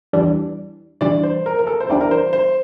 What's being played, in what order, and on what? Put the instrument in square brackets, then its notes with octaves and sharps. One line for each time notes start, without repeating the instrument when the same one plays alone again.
[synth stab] E2 E3 G3 D4
[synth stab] E2 E3 G3 D4 [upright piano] D5
[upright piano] C5
A#4
A#4
A4
C5
[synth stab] E2 E3 G3 D4 [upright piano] D5
[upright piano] A#4
C5
C5